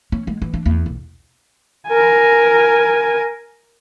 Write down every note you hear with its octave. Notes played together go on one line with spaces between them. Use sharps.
C#4
G#3
E3
D4
E2
B1
A#4 G#5